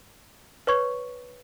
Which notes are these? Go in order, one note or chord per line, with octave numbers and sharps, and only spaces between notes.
B4 C#5 C#6 G#6